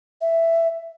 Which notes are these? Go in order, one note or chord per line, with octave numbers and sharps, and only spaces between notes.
E5